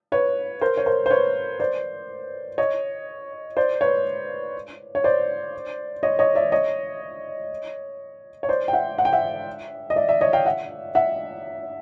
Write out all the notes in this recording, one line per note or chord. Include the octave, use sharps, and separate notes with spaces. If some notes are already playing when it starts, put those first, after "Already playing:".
B4 C#5
A#4 C5
C#5
A#4 C5
C5
B4 C#5
C5 D5
C#5 D#5
C5 D5
B4 C#5
C#5
C5 D5
C#5 D#5
C#5 D#5
D5 E5
C#5 D#5
C#5
C5 D5
G5
E5 F#5
F#5
G5
E5 F#5
D#5
D5 E5
D5 E5
C#5 D#5
F5 G5
E5 F#5
E5 F#5